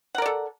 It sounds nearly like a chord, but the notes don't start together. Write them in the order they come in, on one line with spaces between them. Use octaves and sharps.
F#5 A#4 D5 A4